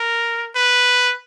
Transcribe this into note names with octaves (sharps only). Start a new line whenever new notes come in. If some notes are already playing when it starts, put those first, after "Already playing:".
Already playing: A#4
B4